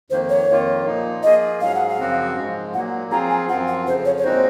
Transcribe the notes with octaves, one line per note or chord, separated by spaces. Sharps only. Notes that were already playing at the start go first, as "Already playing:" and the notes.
F2 D#3 A#3 C5
C#5
F2 D#3 A#3 F4
A#2 F3 A#3 D#4
F3 A#3 F4 G#4 D#5
G#2 F#3 C#4 G#4 F5
F#5
F5
F#2 C#3 F3 C4 F#4
G#2 F3 G#3
A#2 F#3 A#3 F#5
F3 C4 F4 G#4 A#5
G#5
F#2 F3 C4 F4 F#5
F#5
F2 C#3 F3 C5
C#5
C#5
A#2 G#3 C4 D#4 F#4 C5